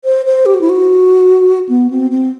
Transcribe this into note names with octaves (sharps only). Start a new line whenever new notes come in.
C5
C5
G4
F#4
E4
F#4
B3
C4
C4